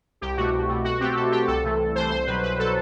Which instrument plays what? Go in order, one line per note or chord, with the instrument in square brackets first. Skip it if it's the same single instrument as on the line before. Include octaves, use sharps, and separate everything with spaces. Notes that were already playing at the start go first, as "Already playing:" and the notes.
[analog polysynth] C2 G4
B2 A3 F#4
C2
B2 A3
B2 F#4
A3 C4 G4
B2 A4
A3 C4 G4
C2 A4
C3 E3 A3
C2
C3 E3 A3 C5
C2 C5
B2 F#3 B4
C2 B4
B2 F#3 A4